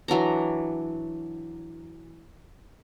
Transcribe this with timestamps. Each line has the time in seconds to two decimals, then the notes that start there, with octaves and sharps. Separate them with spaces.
0.08 E3 F#3 D4 A#5